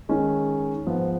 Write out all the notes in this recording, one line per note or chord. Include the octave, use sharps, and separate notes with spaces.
D#3 G#3 C#4
G#2 F3 B3